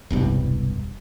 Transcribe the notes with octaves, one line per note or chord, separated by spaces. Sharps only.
E1 C2 G2